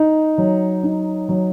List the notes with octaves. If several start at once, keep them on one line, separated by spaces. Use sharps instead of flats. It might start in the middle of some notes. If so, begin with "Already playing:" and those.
Already playing: D#4
F#3
D#4
F#3